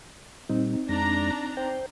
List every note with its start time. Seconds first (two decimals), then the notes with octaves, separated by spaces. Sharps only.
0.50 A#2 G3 C4 D#4
0.89 F2 G#3 D4 A#5 A#6
1.57 C5 G5